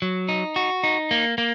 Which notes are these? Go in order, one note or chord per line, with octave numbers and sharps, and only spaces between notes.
F#3
D#4
F#4
D#4
A#3
A#3